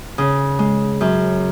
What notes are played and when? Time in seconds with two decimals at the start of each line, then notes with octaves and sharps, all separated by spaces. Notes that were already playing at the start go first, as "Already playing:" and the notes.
0.18 C#3
0.59 G#3
1.01 F#2